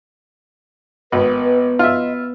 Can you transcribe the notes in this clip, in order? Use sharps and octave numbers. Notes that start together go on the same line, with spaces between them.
G#1 B3 B4
F4 D#5 E5